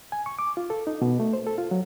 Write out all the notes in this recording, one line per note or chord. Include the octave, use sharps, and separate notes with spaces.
G#5
C#6
D6
F4
A4
D#4
B2
A3
C5
A4
F4
F#3